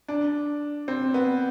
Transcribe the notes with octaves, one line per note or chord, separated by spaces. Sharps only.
D4
C4
B3